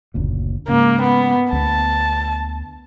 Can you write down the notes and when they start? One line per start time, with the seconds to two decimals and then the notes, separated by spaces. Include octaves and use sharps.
0.14 F#1 D2 A#2
0.68 G#2 C#3 A#3
1.02 B3
1.53 D2 B3 A5